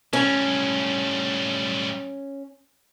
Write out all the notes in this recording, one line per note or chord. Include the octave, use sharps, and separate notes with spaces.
A2 G3 C#4